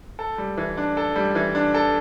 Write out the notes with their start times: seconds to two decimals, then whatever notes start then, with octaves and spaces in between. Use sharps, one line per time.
0.19 A4
0.38 G3
0.58 E3
0.77 D4
0.97 A4
1.16 G3
1.35 E3
1.55 D4
1.74 A4